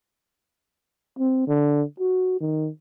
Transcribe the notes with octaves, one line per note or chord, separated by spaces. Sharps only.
C4
D3
F#4
D#3